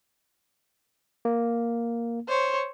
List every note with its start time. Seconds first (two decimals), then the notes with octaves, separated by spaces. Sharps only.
1.25 A#3
2.28 C5 C#5